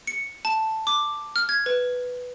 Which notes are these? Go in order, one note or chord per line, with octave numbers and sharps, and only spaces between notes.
C#7
A5
D6
F6
G#6
B4